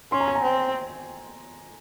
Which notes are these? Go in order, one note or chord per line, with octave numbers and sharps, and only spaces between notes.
C#4 C6
A#5
G#5
A#5
C4